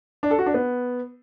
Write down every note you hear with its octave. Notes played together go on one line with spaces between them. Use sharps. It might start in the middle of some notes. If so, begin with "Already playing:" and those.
D4
A4
F#4
D4
B3